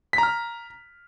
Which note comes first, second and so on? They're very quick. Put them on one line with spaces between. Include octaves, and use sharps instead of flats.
B6 A#5 F6